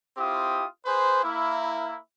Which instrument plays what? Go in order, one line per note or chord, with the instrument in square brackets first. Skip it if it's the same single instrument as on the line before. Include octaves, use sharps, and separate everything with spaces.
[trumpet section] C4 E4 F4 G4 D#6
G#4 B4 C5
A#3 E4